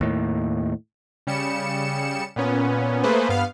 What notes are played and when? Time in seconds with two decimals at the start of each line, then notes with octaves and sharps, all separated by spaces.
0.01 D#2 A2
1.27 C#3 G3 C#7 E7
2.36 A#2 B3 C#4
3.03 A3 A#3 G#4 B4 C5
3.29 G2 B3 F5 F6